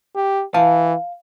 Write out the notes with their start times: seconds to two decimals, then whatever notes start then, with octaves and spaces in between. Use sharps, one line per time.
0.15 G4
0.54 E3 F5 A5